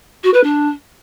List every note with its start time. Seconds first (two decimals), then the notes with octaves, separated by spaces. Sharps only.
0.23 F#4
0.33 B4
0.43 D4